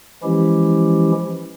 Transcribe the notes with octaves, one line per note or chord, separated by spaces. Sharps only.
E3 F3 G#3 C#4 E4 G4